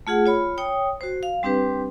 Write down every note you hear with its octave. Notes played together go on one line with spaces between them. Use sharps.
A3 F4 G#4 F#5
F4 C#5 B5
C#5 G5 D#6
F#4 C5
F5
G3 C4 D4 G4 B4